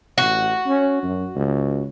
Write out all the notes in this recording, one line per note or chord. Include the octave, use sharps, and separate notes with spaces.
A1 F#4
C#4
F#2
C#2